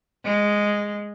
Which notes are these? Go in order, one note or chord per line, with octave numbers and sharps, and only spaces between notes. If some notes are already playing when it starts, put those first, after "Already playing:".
G#3